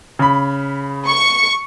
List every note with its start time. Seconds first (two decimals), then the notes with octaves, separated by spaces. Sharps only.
0.19 C#3 B5
1.07 C#6